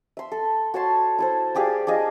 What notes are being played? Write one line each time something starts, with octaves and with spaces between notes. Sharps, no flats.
E5 C6
A4
F#4 C#5 A5 C6
E4 A4 C5
F4 G4 G#4 D5
D4 F4 G#4 D#5